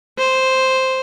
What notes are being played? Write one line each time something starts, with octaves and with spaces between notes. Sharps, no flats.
C5